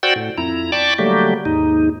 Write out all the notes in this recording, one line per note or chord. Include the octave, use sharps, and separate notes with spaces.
F#4 C5 D5 F#5 G5 E6
A2
F2 E4 A#5
D5 G5 A5 B5 C#6 D6
D3 F#3 G3 A3 A#3 G4
D#2 G#2 D#4